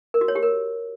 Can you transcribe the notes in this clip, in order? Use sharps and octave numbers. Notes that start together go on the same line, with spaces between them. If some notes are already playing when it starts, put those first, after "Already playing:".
A#4
F#4
C#5
G4
A#4